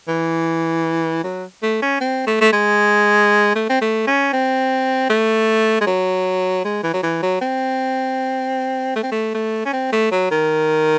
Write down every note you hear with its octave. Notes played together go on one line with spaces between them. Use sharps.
E3
F#3
A3
C#4
C4
A3
A3
G#3
A3
C4
A3
C#4
C4
A3
G#3
F#3
G#3
E3
F#3
E3
F#3
C4
A3
C4
A3
A3
C#4
C4
A3
F#3
D#3